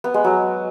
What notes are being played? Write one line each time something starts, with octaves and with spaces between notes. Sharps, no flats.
B3
G#3
F#3